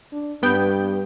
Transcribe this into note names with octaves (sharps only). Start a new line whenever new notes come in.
D4
G2 B3 G5 G6